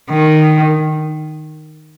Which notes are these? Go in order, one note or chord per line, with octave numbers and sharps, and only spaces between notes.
D#3